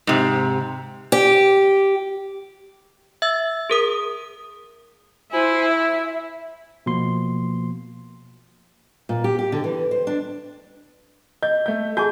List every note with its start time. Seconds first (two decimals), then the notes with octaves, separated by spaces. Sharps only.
0.07 G#2 C3
1.12 G4
3.22 E5 E6 A6
3.70 G#4 A#4 D#6
5.32 E4 C5 G#5
5.67 E5
6.86 B2 F3 A#3 C6
9.09 A#2
9.24 G4
9.39 G4
9.52 D3
9.64 E3
9.91 C5
10.07 D4
11.43 D#5 G6
11.66 A3 G6
11.97 F#4 G#4 G#5 A5 G6